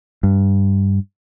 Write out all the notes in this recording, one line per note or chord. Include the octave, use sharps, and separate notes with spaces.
G2